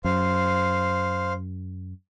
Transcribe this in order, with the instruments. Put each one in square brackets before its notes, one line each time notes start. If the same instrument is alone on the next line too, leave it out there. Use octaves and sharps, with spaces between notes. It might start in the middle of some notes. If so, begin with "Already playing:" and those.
[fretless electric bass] F#2 [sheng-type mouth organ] C5 F5